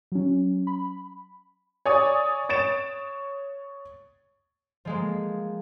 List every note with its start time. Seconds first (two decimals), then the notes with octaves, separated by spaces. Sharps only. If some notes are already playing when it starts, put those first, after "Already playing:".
0.12 F#3 C#4
0.67 B5
1.86 C#5 D5 G#5 D#6
2.49 C#5 A6 D7 E7
4.85 F3 G#3 A#3